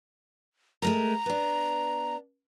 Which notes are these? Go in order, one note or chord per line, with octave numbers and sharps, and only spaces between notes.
G#3 A3 A#4 A#5
B3 D4